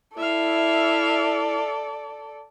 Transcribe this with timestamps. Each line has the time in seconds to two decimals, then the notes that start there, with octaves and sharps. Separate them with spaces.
0.18 E4 A4 D5 E5 F5